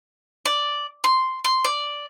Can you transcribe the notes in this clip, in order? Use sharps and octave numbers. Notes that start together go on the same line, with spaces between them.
D5
C6
C6
D5